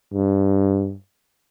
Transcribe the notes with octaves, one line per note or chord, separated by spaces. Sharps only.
G2